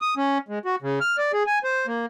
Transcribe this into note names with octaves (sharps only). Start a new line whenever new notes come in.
D#6
C#4
G#3
F#4
C#3
F6
D5
G#4
G#5
C5
A#3